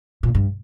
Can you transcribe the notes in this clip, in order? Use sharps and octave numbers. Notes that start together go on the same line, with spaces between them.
A#2
G2